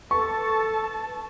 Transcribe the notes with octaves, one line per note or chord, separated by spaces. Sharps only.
A4 B4 A5 C#6